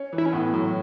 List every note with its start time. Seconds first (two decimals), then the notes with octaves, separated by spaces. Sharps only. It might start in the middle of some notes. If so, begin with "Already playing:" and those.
Already playing: C#4
0.13 E3
0.18 E4
0.26 C#4
0.33 A2 B3
0.53 A2 F#3